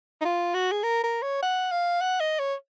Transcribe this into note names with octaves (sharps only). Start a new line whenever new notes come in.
D#4
F4
F#4
G#4
A#4
A#4
C#5
F#5
F5
F#5
D#5
C#5